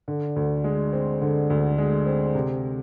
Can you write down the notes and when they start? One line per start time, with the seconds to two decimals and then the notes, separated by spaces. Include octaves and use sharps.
0.08 D3
0.36 D2
0.64 G#3
0.93 C4
1.22 D3
1.50 D2
1.78 G#3
2.06 C4
2.35 C3